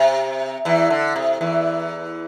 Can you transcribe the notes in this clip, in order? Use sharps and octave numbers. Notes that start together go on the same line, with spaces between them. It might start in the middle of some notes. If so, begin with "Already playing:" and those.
Already playing: C3
E2 E3
D3
C3
E2 E3